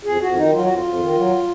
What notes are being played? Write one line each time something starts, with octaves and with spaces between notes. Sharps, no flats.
F2 G#4
F2 F#4
D#3 D#4
F#3 F4
F2 F#4
F4
F2
D#3
F#3